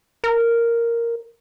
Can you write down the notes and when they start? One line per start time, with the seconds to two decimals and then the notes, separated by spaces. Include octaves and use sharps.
0.24 A#4